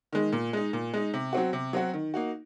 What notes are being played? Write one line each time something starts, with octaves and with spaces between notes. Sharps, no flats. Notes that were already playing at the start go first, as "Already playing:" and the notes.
D#3 G#3
A#2
G#3 D#4
A#2
G#3 D#4
C3
F#3 C4 F#4
C3
F#3 C4 F#4
D#3
A#3 D#4 F#4